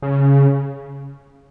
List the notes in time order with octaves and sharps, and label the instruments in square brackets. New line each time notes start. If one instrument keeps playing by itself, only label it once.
[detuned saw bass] C#3